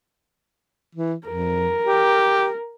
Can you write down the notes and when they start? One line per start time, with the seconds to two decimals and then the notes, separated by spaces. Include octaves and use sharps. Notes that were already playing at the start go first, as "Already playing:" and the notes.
0.95 E3
1.27 F2 A#4
1.85 G4